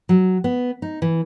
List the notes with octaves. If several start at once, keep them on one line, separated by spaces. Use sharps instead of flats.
F#3
B3
D#4
E3